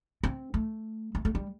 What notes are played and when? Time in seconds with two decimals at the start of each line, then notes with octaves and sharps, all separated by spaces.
0.23 C4
0.54 A3
1.15 A3
1.25 A3
1.35 G3